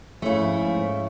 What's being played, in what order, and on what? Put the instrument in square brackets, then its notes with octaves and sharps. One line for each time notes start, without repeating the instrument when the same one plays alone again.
[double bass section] G#2 F3 [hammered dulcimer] C#3 C#5 C#6 [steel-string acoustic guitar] A3 E4